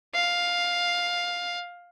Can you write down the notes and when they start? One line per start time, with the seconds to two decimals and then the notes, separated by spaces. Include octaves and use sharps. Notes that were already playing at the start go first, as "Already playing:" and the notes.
0.14 F5